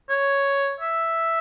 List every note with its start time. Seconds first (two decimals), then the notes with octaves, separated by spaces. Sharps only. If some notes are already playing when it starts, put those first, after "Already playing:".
0.09 C#5
0.80 E5